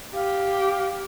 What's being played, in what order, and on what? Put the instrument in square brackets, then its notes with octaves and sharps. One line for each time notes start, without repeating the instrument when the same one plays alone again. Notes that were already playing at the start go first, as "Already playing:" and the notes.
[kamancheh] G4 [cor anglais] F5